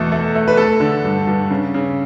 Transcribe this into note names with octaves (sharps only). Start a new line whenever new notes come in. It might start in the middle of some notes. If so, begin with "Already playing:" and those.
Already playing: E2 B2 A3 A4
A3
A3
B4
A3 A4
D3
G2
G2
C#3
C#3